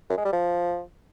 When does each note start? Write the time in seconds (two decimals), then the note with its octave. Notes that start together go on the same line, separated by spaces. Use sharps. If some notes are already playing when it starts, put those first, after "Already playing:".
0.10 F#2
0.17 G#3
0.25 G3
0.33 F3